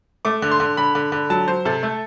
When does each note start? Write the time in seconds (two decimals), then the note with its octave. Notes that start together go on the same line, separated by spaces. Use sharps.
0.25 A3 D6
0.42 D3
0.52 C6
0.60 D3
0.77 D3 B5
0.95 D3
1.12 D3
1.30 F#3 A5
1.47 F#3 C5
1.65 C3 A4
1.83 A3